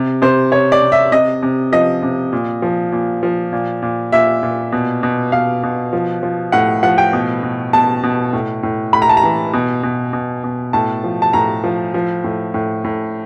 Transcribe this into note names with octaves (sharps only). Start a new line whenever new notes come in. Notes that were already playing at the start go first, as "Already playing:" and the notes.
Already playing: C3
C3 C5
C3 C#5
D5
C3
E5
C3 D#5
C3
F3 D#5
C3
A#2
F3
A#2
F3
A#2
A#2
A#2 E5
A#2
B2
B2
B2 F5
B2
F3
F3
A2 F#5
F3 F#5
G5
B2
B2
B2 A5
B2
A2
A2
A2 B5
A#5
A5
A#5
E3
B2
B2
B2
B2
A2 A5
F3
A5
A2 A#5
F3
F3
A2
A2
A2